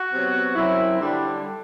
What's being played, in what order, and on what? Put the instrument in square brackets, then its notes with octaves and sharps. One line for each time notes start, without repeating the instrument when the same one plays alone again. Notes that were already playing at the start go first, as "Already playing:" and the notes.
Already playing: [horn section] F#4
C3 F#3 B3
F#2 F#3 C4 E4
D3 G3 D4